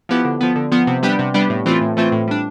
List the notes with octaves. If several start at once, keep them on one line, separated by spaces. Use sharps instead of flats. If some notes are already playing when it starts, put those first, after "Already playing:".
F3 B3 E4 G4
D3
F3 B3
D3
F3 B3
C3
G3 B3 D4 G4
C3
G3 B3 D4 G4
A2
E3 A3 C4 F4
A2
E3 A3 C4 F4
A2
G3 D4